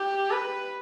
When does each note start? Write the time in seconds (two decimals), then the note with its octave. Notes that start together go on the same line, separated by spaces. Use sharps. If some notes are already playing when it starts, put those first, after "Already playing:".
Already playing: G4
0.31 B4